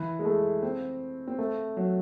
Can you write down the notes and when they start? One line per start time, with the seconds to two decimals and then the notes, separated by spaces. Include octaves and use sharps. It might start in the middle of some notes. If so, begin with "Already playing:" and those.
Already playing: E3
0.19 G#3
0.25 A3
0.63 C4
1.28 C4
1.39 A3
1.77 F#3